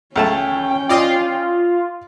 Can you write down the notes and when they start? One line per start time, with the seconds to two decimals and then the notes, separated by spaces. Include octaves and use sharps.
0.16 C#2 A3 C#4 G5 A5
0.89 F4 D5 D#5